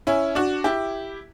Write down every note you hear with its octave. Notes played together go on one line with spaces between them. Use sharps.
C#4 E4
D4 F#4
E4 G4